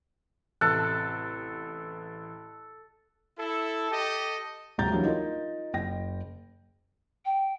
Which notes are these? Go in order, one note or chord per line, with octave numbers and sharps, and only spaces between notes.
A1 C3 A4 A5 F#6
E4 A4
G4 A4 D#5
D#1 C#2 F#3 A#5 G6 A6
E3 F#3 G3 A#3 D4
D#4 F4 A#4
F#1 G5 A#6
G5